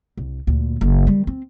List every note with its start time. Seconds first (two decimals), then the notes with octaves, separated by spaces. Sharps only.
0.18 C2
0.47 D2 A#2
0.81 F#1
1.07 D#3 G3
1.27 C4